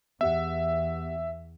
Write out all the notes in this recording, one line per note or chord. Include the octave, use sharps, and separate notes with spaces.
E2 B3 G4 E5 F#5